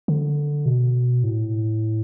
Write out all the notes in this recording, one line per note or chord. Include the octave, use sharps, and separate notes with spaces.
D3
B2
A2